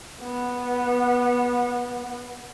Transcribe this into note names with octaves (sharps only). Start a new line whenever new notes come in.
B3